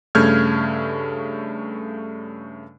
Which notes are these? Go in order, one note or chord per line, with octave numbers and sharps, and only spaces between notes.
G2 C#3 A3 F6 G6 G#6